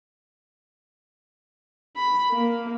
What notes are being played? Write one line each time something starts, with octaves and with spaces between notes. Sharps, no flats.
B5
A#3